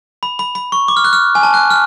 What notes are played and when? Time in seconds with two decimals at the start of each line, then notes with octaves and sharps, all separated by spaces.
0.23 B5
0.39 B5
0.55 B5
0.72 C#6
0.88 D6
0.97 F6
1.04 F#6
1.13 F6
1.35 G#5
1.43 A5
1.54 F#6
1.70 F6